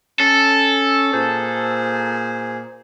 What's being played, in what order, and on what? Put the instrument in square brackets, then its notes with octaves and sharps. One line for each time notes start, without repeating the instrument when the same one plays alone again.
[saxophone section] C#4 [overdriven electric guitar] A4
[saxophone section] A#2 G#4 C5